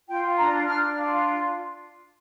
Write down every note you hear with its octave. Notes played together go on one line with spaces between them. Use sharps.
F4 G5
D4 A#5
D4 F6
F4